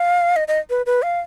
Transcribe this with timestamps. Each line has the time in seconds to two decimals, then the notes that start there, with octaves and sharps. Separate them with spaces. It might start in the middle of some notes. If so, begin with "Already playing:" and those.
Already playing: F5
0.36 D#5
0.48 D#5
0.70 B4
0.86 B4
1.02 F5